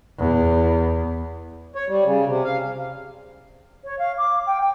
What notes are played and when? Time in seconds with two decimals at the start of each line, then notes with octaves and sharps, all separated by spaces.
0.18 E2
1.75 C#5
1.88 G3
2.05 C#3
2.26 C3
2.44 F5
3.84 C#5
3.98 F5
4.18 D6
4.46 G5
4.61 G5